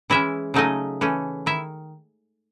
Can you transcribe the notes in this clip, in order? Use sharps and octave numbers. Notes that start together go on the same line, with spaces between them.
E3 G#3 C#4 E4 E5
C#3 F#3 A3 C#4 D#4 D#5
E3 A3 C#4
D#3 E4 E5